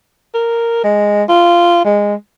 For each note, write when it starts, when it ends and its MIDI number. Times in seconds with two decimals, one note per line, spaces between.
0.34 0.83 70
0.84 1.24 56
1.29 1.81 65
1.84 2.15 56